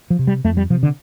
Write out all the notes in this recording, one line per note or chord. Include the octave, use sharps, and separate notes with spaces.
F3
C3
G3
F2 A3
G3
C3 F3
D3